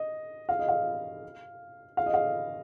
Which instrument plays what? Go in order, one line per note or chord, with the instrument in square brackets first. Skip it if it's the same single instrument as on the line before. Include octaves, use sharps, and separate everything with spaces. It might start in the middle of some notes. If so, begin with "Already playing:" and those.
Already playing: [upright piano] D#5
F5
D#5
F5
F5
D#5
F5